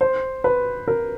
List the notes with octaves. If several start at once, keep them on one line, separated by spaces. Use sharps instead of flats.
C5
B4
A#4